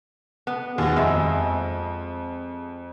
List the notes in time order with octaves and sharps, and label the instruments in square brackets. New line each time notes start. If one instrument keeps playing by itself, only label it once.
[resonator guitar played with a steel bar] B3
[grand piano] D#2 [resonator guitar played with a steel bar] F#4 G#4
[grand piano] F2 [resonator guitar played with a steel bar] G#3 E5